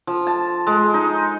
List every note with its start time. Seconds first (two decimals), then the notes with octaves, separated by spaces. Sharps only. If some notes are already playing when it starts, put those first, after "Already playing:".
0.07 F3
0.27 A5
0.67 G#3
0.94 D#4